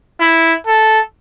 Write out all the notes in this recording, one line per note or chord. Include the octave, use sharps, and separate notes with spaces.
E4
A4